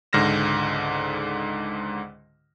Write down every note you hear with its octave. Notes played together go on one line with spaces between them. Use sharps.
C#2 G#2 D3 F6 A#6 E7